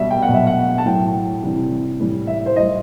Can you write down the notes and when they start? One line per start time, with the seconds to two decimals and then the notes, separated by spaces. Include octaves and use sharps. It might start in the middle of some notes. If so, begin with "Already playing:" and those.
Already playing: B2 G3 E5
0.11 G5
0.22 F#5
0.28 B2 F#3
0.34 E5
0.47 F#5
0.78 A5
0.85 A2 F#3 G5
1.43 C3 E3 G3
2.00 A2 E3 G3
2.27 E5
2.46 C5
2.56 A2 G3 D#5